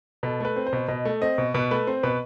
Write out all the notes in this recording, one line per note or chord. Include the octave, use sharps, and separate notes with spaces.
B2 A4
A3 B4
C4
C5
B2
B2 D#5
A3
C4 D#5
B2
B2 B4
A3 B4
C4 C5
B2 B4